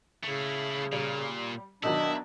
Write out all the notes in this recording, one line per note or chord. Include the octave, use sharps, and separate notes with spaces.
C#3 A3 E4
A#2 G3
B2 D#3 F#3 D4 E4 D#5